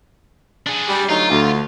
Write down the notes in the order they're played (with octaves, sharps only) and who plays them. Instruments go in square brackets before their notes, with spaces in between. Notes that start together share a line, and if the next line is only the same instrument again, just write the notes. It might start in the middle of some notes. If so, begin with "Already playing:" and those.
[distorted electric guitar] D4 G#4
[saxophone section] G3
[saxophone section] D2 F#3 D#4 [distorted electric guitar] F4
[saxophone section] D2